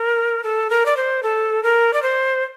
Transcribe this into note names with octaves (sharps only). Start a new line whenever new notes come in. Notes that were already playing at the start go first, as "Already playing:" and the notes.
Already playing: A#4
A4
A#4
D5
C5
A4
A#4
D5
C5